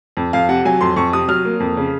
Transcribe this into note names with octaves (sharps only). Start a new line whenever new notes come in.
F2
F2 F5
C3 F#5
F#3 G#5
F2 C6
F2 C#6
C3 D#6
F#3 F6
A#3
F2
C#3